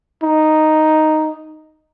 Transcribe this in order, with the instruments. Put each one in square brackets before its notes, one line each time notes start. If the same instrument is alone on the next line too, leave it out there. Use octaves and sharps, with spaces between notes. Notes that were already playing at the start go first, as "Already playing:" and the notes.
[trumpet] D#4